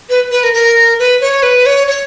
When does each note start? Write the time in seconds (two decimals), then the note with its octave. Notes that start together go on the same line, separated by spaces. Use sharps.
0.10 B4
0.31 B4
0.44 A#4
0.54 A#4
0.99 B4
1.21 C#5
1.43 B4
1.66 C#5
1.87 C#5